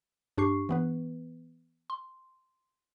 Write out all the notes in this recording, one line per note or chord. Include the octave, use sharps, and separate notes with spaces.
G2 D4 G4 C#6 C7
E3 B3 B4
C6